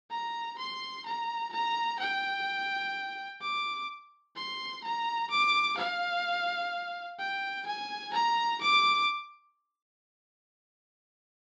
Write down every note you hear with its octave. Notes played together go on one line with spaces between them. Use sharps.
A#5
C6
A#5
A#5
G5
D6
C6
A#5
D6
F5
G5
G#5
A#5
D6